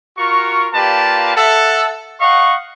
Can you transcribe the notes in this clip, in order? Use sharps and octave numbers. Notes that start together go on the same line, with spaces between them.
F4 F#4 A#4 C#6
A#3 F4 G4 B4 D5 A5
A4 E5 F#5
D#5 F5 F#5 C#6